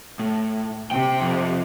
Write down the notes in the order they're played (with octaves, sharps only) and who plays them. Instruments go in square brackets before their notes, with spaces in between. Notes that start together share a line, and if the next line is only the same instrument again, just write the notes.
[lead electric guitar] A2
[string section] C3 [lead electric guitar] G5
[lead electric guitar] F2